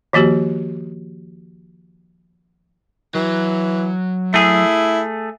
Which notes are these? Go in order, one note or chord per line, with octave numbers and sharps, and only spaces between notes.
D#3 F3 A#3 F#4 G4
E3 F#3
A3 E4 G#4